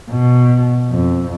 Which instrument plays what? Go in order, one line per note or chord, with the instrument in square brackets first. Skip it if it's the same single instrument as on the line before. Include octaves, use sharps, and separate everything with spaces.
[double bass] B2
F2